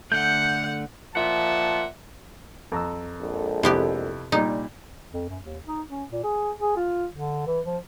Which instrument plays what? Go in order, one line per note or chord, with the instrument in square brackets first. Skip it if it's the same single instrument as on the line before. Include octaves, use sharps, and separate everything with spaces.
[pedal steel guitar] D3 A3 [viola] F#5 [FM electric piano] G6
[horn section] A#2 F3 E5 F#5 A5
[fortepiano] F2 A#5 E6
[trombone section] A#1 G#3 A4
[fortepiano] F2 E4 [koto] C3 B3 G4
[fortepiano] A#2 G3 [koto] D#4
[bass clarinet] F2
F#2
D#2
D#4
C#4
A#2
G#4
G#4
F4
D3
E3
F3